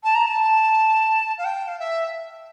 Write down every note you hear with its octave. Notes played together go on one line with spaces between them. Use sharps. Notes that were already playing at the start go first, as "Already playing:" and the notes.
A5
A#5
A5
F5
G5
F5
E5